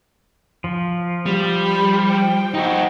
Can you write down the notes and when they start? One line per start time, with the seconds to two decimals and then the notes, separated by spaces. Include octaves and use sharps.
0.64 F3
1.26 G3
1.63 B5
2.08 C5 G5
2.54 D#4 F#4 G5